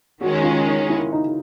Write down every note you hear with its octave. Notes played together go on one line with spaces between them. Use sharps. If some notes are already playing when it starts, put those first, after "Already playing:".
D#3 G#3 C#4 F#4
F4
D#4
E4
D#4